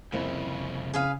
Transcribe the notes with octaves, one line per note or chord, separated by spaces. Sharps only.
C2 F2 C#3 A#3 E4
C#3 G#4 B4 F5